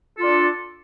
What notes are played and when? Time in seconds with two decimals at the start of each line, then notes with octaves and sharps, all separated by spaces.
0.17 A4
0.19 F4
0.22 D4